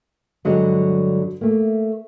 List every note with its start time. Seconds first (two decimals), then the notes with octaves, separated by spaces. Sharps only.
0.45 G2 D3 F#3 G#3
1.41 A3 A#3